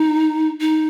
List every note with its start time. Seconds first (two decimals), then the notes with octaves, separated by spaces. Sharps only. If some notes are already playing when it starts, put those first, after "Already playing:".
Already playing: D#4
0.61 D#4